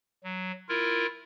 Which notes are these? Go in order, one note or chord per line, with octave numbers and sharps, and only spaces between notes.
F#3
E4 F4 A#4